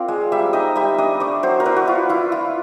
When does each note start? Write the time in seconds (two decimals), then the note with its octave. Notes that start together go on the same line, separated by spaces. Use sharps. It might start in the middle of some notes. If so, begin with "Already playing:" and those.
Already playing: C4 F4 A#4 D5
0.08 G#3
0.32 G3 E5
0.53 D#4 D#5
0.76 G3 E5
0.98 D4 D#5
1.20 A3 D5
1.43 F#3 C5
1.60 A#4
1.65 E4 B4
1.76 F#4
1.87 E4 F4
2.09 E4 F4
2.32 F4